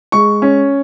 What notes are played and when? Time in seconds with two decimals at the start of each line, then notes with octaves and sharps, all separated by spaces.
0.12 G#3 C#6
0.42 C#4